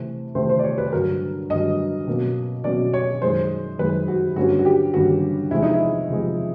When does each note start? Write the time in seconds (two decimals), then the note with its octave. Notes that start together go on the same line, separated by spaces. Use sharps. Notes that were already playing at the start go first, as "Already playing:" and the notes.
Already playing: C3 E3 A3 C4
0.35 C3 E3 A3 C4 C5
0.49 C5
0.59 D5
0.64 C#5
0.78 B4
0.92 G2 D3 F#3 A#4
1.50 G2 D3 F#3 D#5
2.07 B2 F#3 A#3 C#4
2.64 B2 F#3 A#3 C#4 D5
2.94 C#5
3.22 F#2 D#3 G#3 C5
3.79 F#2 D#3 G#3 B4
4.08 F#4
4.36 G2 D3 G3 A#3 C#4 F#4
4.59 F#4
4.65 G4
4.94 G2 D3 G3 A#3 C#4 F#4
5.51 E2 C3 F3 G#3 E4
5.62 D#4
5.74 E4
6.08 E2 C3 F3 G#3